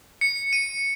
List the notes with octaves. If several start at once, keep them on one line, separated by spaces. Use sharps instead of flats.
C#7
D#7